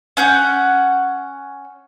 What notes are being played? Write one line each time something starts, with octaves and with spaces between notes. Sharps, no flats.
C#4 F#5 G6